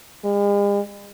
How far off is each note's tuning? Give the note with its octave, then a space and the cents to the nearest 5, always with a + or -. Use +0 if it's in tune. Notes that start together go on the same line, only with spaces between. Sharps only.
G#3 -45